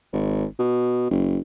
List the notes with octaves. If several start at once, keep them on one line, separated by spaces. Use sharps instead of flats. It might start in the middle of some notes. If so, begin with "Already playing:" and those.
G#1
B2
F#1